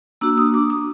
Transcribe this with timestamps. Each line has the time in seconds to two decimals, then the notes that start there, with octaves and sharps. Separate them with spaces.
0.21 A#3 D4 F#4 E6
0.38 D#6
0.54 D6
0.70 D#6